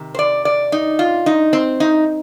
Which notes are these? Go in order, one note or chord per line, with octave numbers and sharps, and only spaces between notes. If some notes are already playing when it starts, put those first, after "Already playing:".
Already playing: C3 D#3
C5
D5
D5
D#4
F4
D#4
C4
D#4